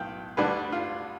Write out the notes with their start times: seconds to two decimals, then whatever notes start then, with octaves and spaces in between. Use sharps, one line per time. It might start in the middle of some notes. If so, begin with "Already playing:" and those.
Already playing: B1 A2 F5 G5
0.37 D2 D3 G3 D4 B4
0.72 F4